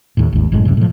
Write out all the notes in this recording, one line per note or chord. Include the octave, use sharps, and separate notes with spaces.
D#2 A2
G#1 D#2
F#1 F#2 A2 G#3
D1 A#1 F#2 C3
A2 F3